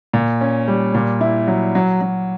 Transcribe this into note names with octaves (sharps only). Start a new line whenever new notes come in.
A#2
C#4
G3
A#2
E4
F#3
F#3
F#3